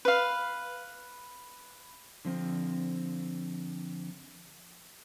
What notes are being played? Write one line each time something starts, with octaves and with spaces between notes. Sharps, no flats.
B4 F5
D3 F3 C4